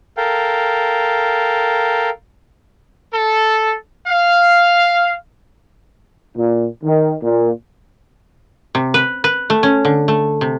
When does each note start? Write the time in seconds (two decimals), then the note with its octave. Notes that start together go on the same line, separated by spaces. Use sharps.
0.17 A4 A#4 F5 G5
3.13 A4
4.08 F5
6.36 A#2
6.83 D#3
7.22 A#2
8.75 C3
8.94 B4
9.24 B4
9.50 A3
9.63 C#4
9.85 D3
10.08 A3
10.41 C3